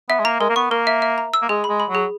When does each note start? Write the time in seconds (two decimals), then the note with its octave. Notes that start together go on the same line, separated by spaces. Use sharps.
0.09 B3 E5
0.20 G#3
0.25 A#3 A#5
0.40 G#3 A#4
0.50 A#3
0.56 B3 C#6
0.71 A#3 A#4
0.87 E5
1.02 E5
1.18 A#5
1.34 E6
1.42 A#3
1.49 G#3 G#4
1.64 B5
1.70 G#3
1.80 B5
1.90 F#3 G#4